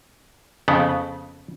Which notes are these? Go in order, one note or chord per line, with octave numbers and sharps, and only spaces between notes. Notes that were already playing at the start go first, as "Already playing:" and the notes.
F2 C#3 B3